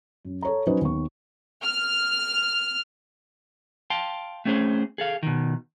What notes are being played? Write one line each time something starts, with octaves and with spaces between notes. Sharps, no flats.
F#2
A4 C#5 A#5
F#3 C#4 D#4 B4 C5 D#5
D#2 B3 C#6
F6
F5 G5 A5 C6
A3 C4 C#4 G#4 C5
G#4 A4 F5
B2 D#3